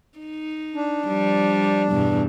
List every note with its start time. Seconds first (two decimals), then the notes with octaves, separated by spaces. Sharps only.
0.18 D#4
0.75 D4
1.07 F3 G3
1.91 E2 G2 B2